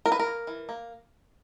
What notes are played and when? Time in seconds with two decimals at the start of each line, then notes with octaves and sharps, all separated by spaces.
0.06 A#3 A#4
0.12 B4
0.19 A#4
0.26 A#3
0.47 E3
0.69 A#3